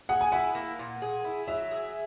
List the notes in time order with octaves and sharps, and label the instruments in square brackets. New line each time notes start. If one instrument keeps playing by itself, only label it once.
[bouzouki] G#4 [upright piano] F#5
[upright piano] G#5
[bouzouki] E4 [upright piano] F#5
[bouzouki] A#3
A#2
G#4
E4
[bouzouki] F#3 [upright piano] E5
[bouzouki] G#4